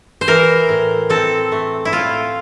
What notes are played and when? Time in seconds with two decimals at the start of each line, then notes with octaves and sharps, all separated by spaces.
0.21 C5
0.28 E3 A#4
0.69 A2
1.10 C4 A4
1.52 A3
1.85 E4
1.92 A2 F4